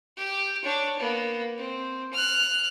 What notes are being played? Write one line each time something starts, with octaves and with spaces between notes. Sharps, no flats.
G4
D4 C#5
A#3 B3
C4
F6 F#6